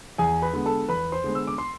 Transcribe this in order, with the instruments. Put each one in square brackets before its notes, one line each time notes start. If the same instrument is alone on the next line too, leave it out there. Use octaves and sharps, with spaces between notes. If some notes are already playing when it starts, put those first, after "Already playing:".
[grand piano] E2 G#4 G#5
B4 B5
D3 G#3 B3
A4 A5
E2 B4 B5
C5 C6
D3 G#3 B3
E6
D6
C6